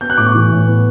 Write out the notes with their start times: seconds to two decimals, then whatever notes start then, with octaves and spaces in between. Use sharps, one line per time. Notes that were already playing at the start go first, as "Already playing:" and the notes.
0.01 B3 G6
0.10 F#6
0.18 A2 D6
0.26 C#6
0.35 E3
0.51 A2
0.67 B3